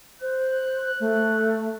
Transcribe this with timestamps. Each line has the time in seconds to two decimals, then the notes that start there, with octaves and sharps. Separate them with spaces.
0.21 C5 F#6
1.00 A3